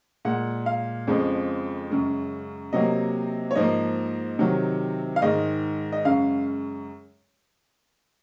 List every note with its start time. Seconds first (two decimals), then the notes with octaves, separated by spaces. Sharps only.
0.25 A#2 G#3 F#5
0.66 F5
1.07 F2 C#3 F3 G#3
1.90 F#2 C#3 G#3
2.73 C3 F#3 A#3 D#5
3.51 C#5
3.55 G#2 F3 A#3 D#5
4.39 C3 D#3 F#3
5.16 F5
5.22 G#2 D#3 G#3 D#5
5.93 D#5
6.05 F#2 C#3 G#3 F5